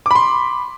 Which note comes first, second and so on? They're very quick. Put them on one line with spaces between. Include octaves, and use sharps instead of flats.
D6 B5 C6